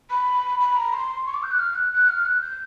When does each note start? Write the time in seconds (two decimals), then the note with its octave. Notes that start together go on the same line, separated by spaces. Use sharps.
0.10 B5
0.60 B5
0.76 A#5
0.93 C6
1.26 C#6
1.34 D6
1.43 G6
1.51 F#6
1.59 F6
1.75 F#6
1.92 F#6
2.09 F6
2.25 F#6
2.41 G6